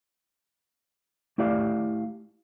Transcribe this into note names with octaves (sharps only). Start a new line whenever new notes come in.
A3 E4 G4 D5 F5